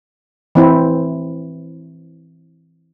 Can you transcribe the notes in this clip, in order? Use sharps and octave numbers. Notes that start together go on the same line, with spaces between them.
E3 C4 E4